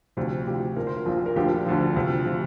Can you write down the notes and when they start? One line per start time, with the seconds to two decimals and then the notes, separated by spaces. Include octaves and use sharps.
0.17 D2 C3 F3
0.47 D2 C3 F3 G4
0.76 A#1 A#2 F3 A#4
0.87 C5
0.97 A#4
1.06 A#1 A#2 F3
1.26 A#4
1.36 D2 D3 F3 G4
1.66 D2 D3 F3
1.95 D2 C3 F3
2.25 C3 F3